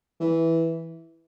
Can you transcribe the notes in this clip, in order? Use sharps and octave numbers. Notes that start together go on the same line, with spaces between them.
E3